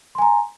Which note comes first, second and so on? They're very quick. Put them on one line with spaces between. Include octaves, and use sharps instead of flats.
C6 G#5 A#5